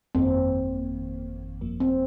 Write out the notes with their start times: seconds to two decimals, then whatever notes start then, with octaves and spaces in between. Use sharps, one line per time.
0.15 G1 F2 D#3 A#3 C4
1.61 G1 F2 F3 A#3
1.80 C4